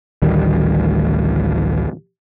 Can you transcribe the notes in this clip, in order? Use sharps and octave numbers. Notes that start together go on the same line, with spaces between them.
A1 D2 D#3 G3